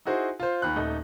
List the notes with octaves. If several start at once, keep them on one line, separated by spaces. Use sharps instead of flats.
D#4 E4 F#4 G#4 C5
F4 C5
D#2 B5 F#6
D#1 A3 D#4